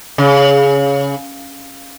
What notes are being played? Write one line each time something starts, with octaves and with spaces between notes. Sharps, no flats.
C#3